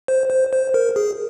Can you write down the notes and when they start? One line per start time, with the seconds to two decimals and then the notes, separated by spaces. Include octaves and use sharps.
0.08 C5
0.30 C5
0.53 C5
0.74 A#4
0.96 G#4